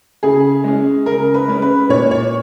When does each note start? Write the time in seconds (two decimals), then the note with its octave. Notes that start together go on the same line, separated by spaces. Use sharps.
0.23 C#3 G#4
0.64 G#3 C#4
1.06 C#3 A#4
1.34 B4
1.48 G#3 C#4
1.62 B4
1.89 A#2 C#5
2.11 C#5